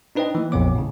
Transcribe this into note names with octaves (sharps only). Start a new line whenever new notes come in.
D4 D#4 B4 C5 D#5 G5
E3 A#3
A#1 F2 A#2 B3 C#5 D6
A2 C#3